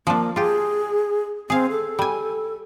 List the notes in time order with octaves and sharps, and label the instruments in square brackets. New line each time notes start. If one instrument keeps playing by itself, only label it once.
[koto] F3 D4 [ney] A#3
[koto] F4 G4 [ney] G#4
[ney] C4 [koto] G#4 F5
[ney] A4
[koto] G3 G#5